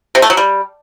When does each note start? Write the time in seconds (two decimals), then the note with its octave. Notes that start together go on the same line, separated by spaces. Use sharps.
0.15 C3
0.22 A3
0.30 F#3
0.37 G3